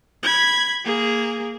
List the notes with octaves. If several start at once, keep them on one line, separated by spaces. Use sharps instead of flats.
B5 G#6
A#3 G#4